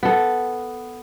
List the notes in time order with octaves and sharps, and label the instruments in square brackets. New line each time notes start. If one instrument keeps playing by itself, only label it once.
[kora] B3 A4